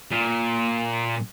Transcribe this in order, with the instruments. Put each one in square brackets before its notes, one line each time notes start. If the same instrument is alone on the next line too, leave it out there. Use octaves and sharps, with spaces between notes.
[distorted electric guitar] A#2